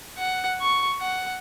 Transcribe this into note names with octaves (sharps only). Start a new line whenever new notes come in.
F#5
C#6
F#5